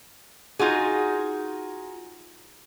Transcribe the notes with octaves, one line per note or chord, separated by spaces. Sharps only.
D#4 F4 F#4 G#4